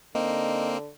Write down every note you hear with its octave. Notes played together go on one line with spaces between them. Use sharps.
D3 A#3 C4 D#4